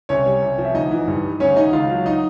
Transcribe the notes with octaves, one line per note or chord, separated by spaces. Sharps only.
C2 C#4 C#5
G3
C2
F3
E5
D2 D#4 D#5
E3
G2
G3
D2 C#4 C#5
D#3 D#4 D#5
C#2 F4 F5
F#3
D#4 D#5